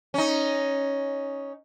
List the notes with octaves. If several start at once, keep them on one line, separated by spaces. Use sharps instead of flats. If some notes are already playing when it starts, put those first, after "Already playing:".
C#4 D#4